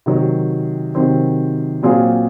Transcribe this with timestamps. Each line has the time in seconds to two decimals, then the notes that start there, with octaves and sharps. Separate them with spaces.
0.06 C3 D#3 F#3 C4
0.95 C3 D#3 F#3 C4
1.83 A#2 F#3 C4 F4 G#4